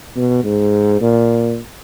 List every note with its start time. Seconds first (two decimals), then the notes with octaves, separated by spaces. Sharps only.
0.16 B2
0.44 G#2
1.01 A#2